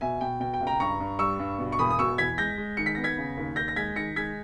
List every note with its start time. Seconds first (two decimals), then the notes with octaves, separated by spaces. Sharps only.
0.01 B2 E5 G#5
0.21 B2 G5
0.40 B2 G5
0.54 G5
0.60 C#2
0.67 G5 A#5
0.80 G2 A#5 C#6
1.00 G2
1.19 G3 C#6 E6
1.39 G2
1.59 B2
1.72 C#6
1.79 E1 B5 D#6
1.91 D#6
1.99 B2 C#6 E6
2.18 E2 G#6 B6
2.38 G#3 G6 A#6
2.58 G#3
2.77 D#3 C#7
2.86 B6
2.95 B3 A#6
3.04 G#6 B6
3.17 C#3
3.37 D#2
3.56 D#2 G6 A#6
3.68 A#6
3.76 G#3 G#6 B6
3.96 D#3 A#6 C#7
4.16 G#3 G#6 B6